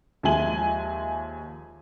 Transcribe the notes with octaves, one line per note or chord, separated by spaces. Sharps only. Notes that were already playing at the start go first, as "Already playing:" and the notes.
D#2 F3 G#3 E5 G#5 F#7